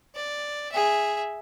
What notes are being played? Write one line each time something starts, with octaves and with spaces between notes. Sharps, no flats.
D5
G#4 E5